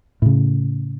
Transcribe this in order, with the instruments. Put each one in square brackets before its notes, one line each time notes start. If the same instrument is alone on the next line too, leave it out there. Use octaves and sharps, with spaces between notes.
[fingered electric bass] A2 C#3